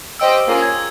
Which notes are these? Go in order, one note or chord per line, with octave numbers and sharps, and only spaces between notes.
G4 C5 D#5 G5 E6
A#3 C#4 F4 G#4
G#6